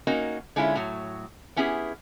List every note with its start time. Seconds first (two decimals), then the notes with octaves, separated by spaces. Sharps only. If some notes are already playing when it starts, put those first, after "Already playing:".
0.07 A#3 C#4 D#4 F#4 A#4
0.56 D3 G#3 C#4 E4 F4 E5
0.76 A2 F#3
1.56 B3 C#4 E4 G4 G#4